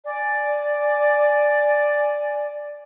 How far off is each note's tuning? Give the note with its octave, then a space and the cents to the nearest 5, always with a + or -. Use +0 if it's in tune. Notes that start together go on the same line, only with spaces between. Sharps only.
D5 +0 G#5 +5